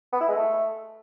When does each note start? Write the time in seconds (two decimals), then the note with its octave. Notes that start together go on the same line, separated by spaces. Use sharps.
0.12 B3
0.20 E4
0.28 G#3
0.36 A3